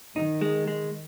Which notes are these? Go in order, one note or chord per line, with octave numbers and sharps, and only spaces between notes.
D#3 D#4
G#3
G#3